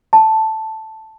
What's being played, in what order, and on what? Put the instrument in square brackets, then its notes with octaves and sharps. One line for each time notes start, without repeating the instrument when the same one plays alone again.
[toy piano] A5